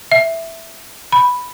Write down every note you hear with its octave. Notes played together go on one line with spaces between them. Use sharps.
E5
B5